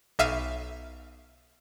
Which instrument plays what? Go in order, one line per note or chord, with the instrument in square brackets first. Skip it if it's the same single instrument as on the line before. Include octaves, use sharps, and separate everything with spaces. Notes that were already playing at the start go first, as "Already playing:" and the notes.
[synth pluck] B1 E5 F5 D#7